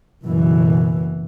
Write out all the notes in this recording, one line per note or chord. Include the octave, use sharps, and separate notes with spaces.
F#1 B2 E3